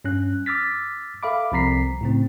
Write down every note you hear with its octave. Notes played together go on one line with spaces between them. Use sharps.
G2 C#4 F#6
D6 E6 F6 A6 B6
A4 E5 F5 B5 D6
C2 F3 C4 A#5 B6 C7
A2 C#3 C4